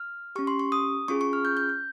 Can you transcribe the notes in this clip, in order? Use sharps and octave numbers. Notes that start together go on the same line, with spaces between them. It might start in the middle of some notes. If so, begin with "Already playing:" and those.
Already playing: F6
C#4 G4 C#6
C6
C#6
D#6
C#4 F4 G#4 C#6
C#6
F6
G6
G6
G6